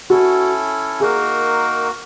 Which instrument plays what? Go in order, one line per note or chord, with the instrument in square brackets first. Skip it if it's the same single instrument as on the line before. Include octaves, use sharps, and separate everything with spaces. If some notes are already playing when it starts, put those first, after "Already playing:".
[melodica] C#4 E4 A4 [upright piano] F#4
[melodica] A#3 D#4 F#4 A#4 [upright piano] G#4